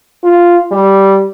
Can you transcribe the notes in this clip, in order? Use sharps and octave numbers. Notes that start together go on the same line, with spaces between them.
F4
G3